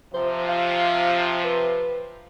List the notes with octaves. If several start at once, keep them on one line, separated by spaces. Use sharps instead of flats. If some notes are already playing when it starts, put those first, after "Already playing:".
C3 F3 C5
F5
B4